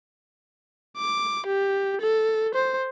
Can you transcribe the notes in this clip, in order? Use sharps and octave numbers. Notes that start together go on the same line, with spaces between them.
D6
G4
A4
C5